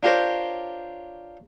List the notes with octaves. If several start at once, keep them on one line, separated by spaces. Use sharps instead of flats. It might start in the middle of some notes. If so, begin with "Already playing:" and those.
D4 F4 G4 A#4 C5 C#5